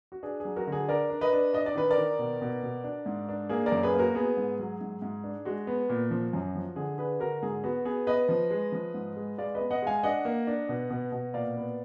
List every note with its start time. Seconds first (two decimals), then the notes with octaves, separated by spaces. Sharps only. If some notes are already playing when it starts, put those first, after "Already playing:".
0.12 F#4
0.23 D4 G#4
0.40 F#3 G#4
0.56 F#4 A#4
0.67 D3
0.72 G#4
0.88 D4 A#4 D5
1.10 D4
1.21 B4 D#5
1.33 D4
1.53 D4 D#5
1.66 D5
1.75 D#3 B4
1.90 A#4 D5
1.98 D#3
2.19 B2
2.41 B2
2.63 B2
2.84 D4
3.06 G#2
3.29 D4
3.49 A#3 G#4
3.66 A#4 D5
3.72 F#2
3.83 G#4 B4
3.93 A#3
3.99 F#4 A#4
4.15 B3 G#4
4.37 G#2
4.59 F#3
4.81 G#2
5.02 G#2
5.24 D4
5.45 G#3 F#4
5.67 B3
5.89 A#2
6.11 F3
6.33 F#2
6.55 F3
6.76 D3 G#4
6.98 D4 G#4 B4
7.20 D3 F#4 A#4
7.42 G#2 G#4
7.64 B3 F#4
7.85 B3 G#4
8.07 B3 B4 D#5
8.29 F3
8.51 G#3
8.72 F3
8.94 G#2
9.16 G#3
9.38 G#3 D5 F5
9.55 B4 D#5
9.60 B3
9.71 D#5 F#5
9.82 G#3 F5 G#5
10.03 D4 D#5 F#5
10.25 A#3
10.47 D4
10.69 B2
10.90 B2
11.12 B2
11.34 A#2 D5 F5
11.56 B3